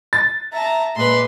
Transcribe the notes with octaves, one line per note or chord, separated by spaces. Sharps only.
A6
E5 A5 A#5
A#2 G#3 B4 C6